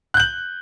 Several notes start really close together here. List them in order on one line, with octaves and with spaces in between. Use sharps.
F#6 G6 F#7